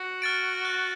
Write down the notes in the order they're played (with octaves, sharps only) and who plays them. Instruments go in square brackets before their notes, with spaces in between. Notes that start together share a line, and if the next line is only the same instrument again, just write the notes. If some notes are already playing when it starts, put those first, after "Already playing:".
Already playing: [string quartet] F#4
[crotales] F6 A6 D7
F#6